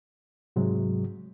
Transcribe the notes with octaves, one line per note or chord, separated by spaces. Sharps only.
G#2 C3 F#3 G#3